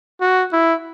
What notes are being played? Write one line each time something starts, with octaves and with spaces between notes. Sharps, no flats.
F#4
E4